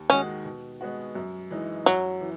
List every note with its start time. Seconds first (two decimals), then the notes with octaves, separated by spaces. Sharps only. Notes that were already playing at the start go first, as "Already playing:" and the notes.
Already playing: D#2
0.10 D#3 G#3 C#4 D#4 F#4
0.45 B2
0.81 G#3 B3 F#4
1.15 F#2
1.51 E3 G#3 D#4
1.86 F#2 F#3
2.21 E3